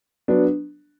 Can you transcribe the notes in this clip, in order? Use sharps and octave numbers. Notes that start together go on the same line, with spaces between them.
F#3 B3 D4